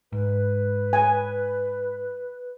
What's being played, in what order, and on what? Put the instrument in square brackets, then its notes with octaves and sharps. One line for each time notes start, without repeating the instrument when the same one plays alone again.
[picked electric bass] G#2 [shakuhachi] B4
[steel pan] G#5